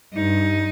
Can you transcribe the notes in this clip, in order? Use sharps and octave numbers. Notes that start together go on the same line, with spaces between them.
G2 D#4